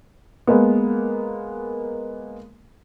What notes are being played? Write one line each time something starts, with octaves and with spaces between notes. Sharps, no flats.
G#3 A#3 B3